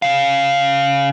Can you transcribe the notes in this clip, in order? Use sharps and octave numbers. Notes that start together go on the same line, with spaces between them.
C#3 F5